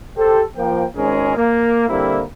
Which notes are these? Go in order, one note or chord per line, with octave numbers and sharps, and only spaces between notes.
G4 A4 C5
F3 A#3 G5
G#1 G#2 G#3 C#4 G#4 A#4
A#3
D3 G3 A#3 C4 E4